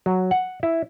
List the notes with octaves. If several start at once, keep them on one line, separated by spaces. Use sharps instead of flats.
F#3
F#5
E4